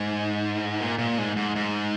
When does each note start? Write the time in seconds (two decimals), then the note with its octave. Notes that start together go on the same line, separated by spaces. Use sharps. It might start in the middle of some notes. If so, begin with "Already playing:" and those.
Already playing: G#2
0.80 A#2
0.99 A#2
1.18 G#2
1.36 G#2
1.56 G#2